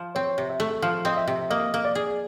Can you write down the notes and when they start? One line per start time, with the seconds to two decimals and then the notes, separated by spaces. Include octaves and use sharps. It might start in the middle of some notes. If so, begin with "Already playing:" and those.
Already playing: F3
0.15 C4 C#5
0.38 C3
0.50 E5
0.60 A3
0.82 F3 F5
1.05 C4 D#5
1.17 E5
1.28 C3
1.50 A#3 D#5
1.74 A#3
1.85 D5
1.95 G#4